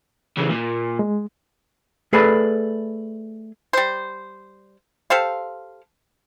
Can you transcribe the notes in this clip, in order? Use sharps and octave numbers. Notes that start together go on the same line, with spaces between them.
C#3 E3
A#2
G#3
A3 G#4 A4 B4 D5 G#5
G3 C5
G4 A4 C5 F5